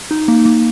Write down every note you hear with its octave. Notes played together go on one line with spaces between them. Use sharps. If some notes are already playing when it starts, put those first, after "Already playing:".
D#4
A#3
A#3